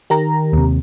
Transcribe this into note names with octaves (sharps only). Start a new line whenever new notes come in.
D#3 G4 A#4 A#5
D#2 C3